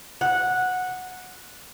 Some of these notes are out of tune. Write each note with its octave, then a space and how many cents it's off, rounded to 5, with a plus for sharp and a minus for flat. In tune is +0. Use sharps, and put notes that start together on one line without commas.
F#5 -10